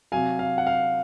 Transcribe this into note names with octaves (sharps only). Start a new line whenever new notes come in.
C3 F#3 F5 G#5
F5
F#5
F5